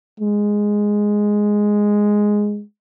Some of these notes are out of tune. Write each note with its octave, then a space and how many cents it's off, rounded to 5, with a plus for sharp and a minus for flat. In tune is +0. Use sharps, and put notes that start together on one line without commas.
G#3 -5